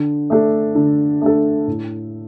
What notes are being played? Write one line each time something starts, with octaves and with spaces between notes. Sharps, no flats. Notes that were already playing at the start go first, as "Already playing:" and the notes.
Already playing: D3
A3 D4 A4
D3
A3 D4 A4
A2